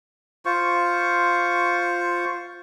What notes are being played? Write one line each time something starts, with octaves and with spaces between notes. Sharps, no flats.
F4 C5 C#6